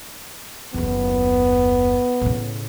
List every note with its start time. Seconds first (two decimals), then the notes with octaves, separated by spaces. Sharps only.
0.74 F#1 D#2 B3
2.21 A2 C#3